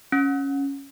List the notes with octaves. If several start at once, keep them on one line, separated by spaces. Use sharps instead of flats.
C#4